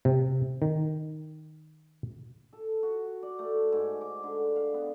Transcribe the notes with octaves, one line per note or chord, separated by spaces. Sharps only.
C3
D#3
A4
F#4
D5
A3
G#2
D6
D3
F5
B3